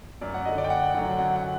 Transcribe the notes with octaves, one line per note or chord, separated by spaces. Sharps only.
F#2 D5
F#5
D3 F#3 D#5
D5
G5
F#2 F#5
D3 F#3
F#2 F#5
F#5